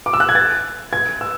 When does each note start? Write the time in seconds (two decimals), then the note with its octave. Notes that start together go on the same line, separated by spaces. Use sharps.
0.06 D6
0.13 E6
0.20 F#6
0.29 G#6
0.35 A6
0.93 G#6
1.21 E6